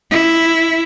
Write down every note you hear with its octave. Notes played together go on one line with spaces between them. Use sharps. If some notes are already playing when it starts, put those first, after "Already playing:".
E4